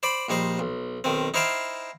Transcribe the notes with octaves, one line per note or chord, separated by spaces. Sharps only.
C5 D5 B5 D6
A#1 G3 D#4 C5
B1
B1 D#3 C4
D#4 E4 C5 F5 G5 A5